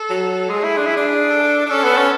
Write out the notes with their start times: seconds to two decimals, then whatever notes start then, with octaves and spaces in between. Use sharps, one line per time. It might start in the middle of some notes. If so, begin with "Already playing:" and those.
Already playing: A4
0.10 F#3
0.49 G#3 G#4
0.64 E4
0.77 D4
0.86 E4
0.97 D4
1.31 A4
1.66 D4
1.69 C#4 A4
1.84 B3
1.97 C#4